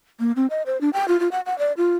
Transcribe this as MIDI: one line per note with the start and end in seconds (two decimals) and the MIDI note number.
0.20 0.32 58
0.36 0.46 60
0.50 0.62 75
0.66 0.80 72
0.81 0.89 62
0.93 1.07 79
1.08 1.19 65
1.20 1.28 65
1.31 1.40 78
1.46 1.57 78
1.58 1.72 74
1.77 1.95 65